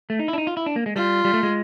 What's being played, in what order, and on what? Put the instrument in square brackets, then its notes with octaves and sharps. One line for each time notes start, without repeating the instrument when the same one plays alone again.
[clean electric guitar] A3
D#4
E4
D4
D#4
F4
E4
D4
A#3
G#3
[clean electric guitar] G3 [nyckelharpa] F4
[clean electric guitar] G3
A3
G#3